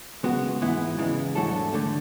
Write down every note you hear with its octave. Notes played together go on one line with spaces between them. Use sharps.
C#3 G#3 B3 F#4
G#2 E3 B3 E4
E2 C#3 E3 G#3
G#2 F#3 A3 D4 A4
D3 A3